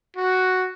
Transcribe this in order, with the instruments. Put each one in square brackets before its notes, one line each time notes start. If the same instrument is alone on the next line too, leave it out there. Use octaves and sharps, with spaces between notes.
[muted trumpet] F#4